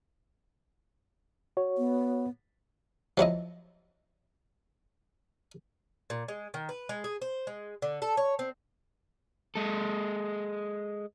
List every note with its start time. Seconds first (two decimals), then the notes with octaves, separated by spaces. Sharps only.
1.57 F#4 C#5
1.78 B3
3.17 F3 F#3 E4 D#5
6.10 A#2
6.28 G#3
6.54 D#3
6.69 B4
6.89 G#3
7.04 G#4
7.22 C5
7.47 G#3
7.82 D3
8.02 A4
8.17 C#5
8.39 C4
9.55 G#3 A4